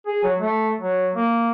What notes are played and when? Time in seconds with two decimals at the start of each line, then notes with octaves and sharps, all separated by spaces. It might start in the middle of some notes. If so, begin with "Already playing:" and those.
0.07 G#4
0.24 F#3
0.40 A3
0.80 F#3
1.16 A#3